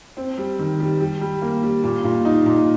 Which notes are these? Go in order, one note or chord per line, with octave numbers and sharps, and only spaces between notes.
C4
G3
D#3
G3
G3
G3
A#3
G3
A#2
A#2
D#4
A#2